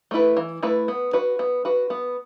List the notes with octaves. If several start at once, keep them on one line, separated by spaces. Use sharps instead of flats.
A3 E4 B4
E3
A3 E4 B4
B3
F#4 B4
B3
F#4 B4
B3